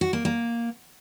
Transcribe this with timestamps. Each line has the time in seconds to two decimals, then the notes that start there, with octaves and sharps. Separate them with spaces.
0.01 F#4
0.13 A#3
0.25 A#3